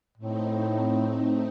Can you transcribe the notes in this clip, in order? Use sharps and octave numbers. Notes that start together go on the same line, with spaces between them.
A2 A3 C4 D#4